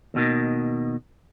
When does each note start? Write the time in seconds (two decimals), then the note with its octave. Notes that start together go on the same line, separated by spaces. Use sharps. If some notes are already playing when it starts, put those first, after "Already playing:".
0.14 D#2 B2 D#3